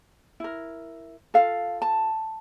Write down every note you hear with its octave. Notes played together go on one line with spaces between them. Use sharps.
E4 A#4
F4 A4 F5
A5